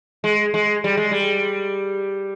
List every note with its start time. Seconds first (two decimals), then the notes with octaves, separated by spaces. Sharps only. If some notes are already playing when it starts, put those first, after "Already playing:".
0.24 G#3
0.54 G#3
0.84 G3
0.97 G#3
1.11 G3